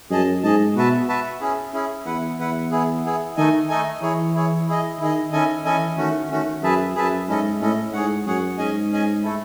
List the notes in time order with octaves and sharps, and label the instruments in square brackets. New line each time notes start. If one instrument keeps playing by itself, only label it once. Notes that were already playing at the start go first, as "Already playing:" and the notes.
[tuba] F#2 [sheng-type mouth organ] G#4 D#5 A5
[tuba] G#2 [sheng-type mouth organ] G#4 D#5 A5
[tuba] B2 [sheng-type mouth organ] F#4 B4 E5 A5
[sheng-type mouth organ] F#4 B4 E5 A5
C#4 E4 G#4
C#4 E4 G#4
[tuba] E2 [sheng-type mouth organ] E4 B4 F#5
[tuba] E2 [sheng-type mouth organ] E4 B4 F#5
[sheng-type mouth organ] B3 E4 G#4
B3 E4 G#4
[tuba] D#3 [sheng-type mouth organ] A3 D#4 A4 D#5 G#5
[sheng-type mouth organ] A3 D#4 A4 D#5 G#5
[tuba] E3 [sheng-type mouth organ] E4 G#4 C#5
[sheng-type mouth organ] E4 G#4 C#5
E4 G#4 D#5
[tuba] D#3 [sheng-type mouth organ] E4 G#4 D#5
[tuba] D#3 [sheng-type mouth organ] C#4 E4 A4 D#5 G#5
[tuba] E3 [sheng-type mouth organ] C#4 E4 A4 D#5 G#5
[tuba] D#3 [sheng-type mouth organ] A3 C#4 F#4
[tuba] D#3 [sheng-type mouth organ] A3 C#4 F#4
[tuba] F#2 [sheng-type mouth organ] G#4 B4 E5 A5
[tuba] F#2 [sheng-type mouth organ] G#4 B4 E5 A5
[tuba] G#2 [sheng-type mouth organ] C#4 E4 A4 D#5
[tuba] A2 [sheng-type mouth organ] C#4 E4 A4 D#5
[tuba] G#2 [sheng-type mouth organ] G#4 C#5 F#5
[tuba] F#2 [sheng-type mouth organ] G#4 C#5 F#5
[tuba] G#2 [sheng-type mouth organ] C#4 G#4 D#5 G#5
[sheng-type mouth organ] C#4 G#4 D#5 G#5
A3 E4 A4